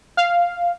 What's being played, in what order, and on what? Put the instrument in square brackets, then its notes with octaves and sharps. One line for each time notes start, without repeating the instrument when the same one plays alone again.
[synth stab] F5